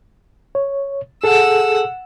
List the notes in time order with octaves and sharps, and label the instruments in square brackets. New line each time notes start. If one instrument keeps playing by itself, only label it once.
[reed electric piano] C#5
[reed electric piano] G#4 A4 [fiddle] F#5 E6